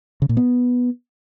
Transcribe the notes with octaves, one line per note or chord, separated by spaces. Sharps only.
C#3
A#2
B3